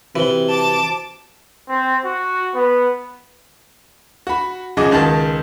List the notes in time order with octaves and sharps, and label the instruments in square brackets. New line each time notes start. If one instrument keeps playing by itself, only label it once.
[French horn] C3 [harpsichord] E3 [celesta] F#4 C5 G7
[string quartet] A5 D6
[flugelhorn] C4
F#4
B3
[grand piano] F#4 B5
C#3 F3 F#4 G#4 D#5 D6
C#2 D#3 G#4 A5 A6